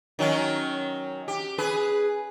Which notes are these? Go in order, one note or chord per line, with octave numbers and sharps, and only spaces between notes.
D#3 F#3 C#4
G4
G#4 B4